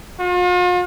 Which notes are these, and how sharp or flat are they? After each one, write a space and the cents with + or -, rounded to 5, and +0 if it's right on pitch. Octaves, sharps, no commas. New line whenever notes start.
F4 +45